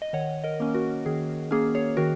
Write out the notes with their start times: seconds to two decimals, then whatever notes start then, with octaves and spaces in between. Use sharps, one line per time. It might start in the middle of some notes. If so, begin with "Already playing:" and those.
0.02 D#5
0.13 D#3 C#5 F#5
0.44 A#4 D#5
0.60 A#3 C#4
0.75 F#4 A#4
1.06 D#3 G#4
1.51 A#3 C#4 G#4
1.75 G#4 C#5
1.97 D#3 F#4 A#4